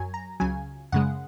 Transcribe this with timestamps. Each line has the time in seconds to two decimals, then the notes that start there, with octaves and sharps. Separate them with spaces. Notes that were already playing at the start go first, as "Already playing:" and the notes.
Already playing: F#2 F#3 G#5
0.14 A#5
0.40 C#2 C#3 F#3 G#5
0.92 F#2 C#3 G#3 F#5